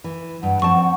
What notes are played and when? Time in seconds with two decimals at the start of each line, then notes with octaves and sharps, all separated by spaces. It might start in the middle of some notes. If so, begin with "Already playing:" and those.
0.04 E3
0.43 G2 F#5
0.62 F3 C4 A5 C#6